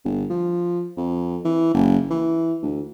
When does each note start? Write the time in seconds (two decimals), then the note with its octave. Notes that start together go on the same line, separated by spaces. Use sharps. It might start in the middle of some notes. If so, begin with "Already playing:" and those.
0.05 G1
0.30 F3
0.97 F2
1.45 E3
1.74 F#1
2.10 E3
2.62 D2